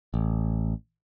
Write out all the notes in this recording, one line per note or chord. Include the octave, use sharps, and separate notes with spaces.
A1